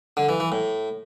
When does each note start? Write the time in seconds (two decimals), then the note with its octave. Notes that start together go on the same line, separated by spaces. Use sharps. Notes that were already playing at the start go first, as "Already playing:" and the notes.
0.17 D3
0.29 E3
0.40 E3
0.52 A2